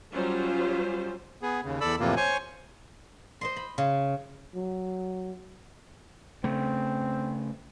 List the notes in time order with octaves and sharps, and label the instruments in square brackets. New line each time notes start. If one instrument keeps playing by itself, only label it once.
[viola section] F#3 G3 C#4 F4 C5
[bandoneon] B3 G#4
D#2 C#3
E2 A4 D5 B5 E6
F2 A2 C3 E3 A#3 F4
C5 C#5 G#5 C#6
[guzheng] C5 D#5 C6
B5
C#3
[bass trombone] F#3
[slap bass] C#3 A3 [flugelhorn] C4